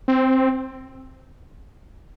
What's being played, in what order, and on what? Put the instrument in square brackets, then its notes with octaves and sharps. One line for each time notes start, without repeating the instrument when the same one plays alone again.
[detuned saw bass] C4